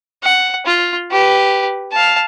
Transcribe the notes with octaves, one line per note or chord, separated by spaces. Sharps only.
F#5
F4
G4 B4
F5 A5